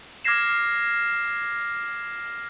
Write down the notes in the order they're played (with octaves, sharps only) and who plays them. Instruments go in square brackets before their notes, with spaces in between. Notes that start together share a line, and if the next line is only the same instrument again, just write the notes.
[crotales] D6 F6 G#6 A#6 C7 E7